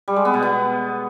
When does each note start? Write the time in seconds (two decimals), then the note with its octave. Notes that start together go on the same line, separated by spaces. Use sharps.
0.08 G3
0.16 G#3
0.25 B3
0.34 B2
0.43 B3